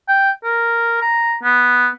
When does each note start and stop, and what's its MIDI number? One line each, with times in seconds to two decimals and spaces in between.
0.09 0.30 79
0.44 0.99 70
1.02 1.34 82
1.43 1.88 59